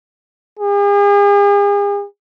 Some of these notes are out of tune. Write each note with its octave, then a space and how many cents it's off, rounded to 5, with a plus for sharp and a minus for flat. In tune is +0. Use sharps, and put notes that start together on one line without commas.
G#4 -40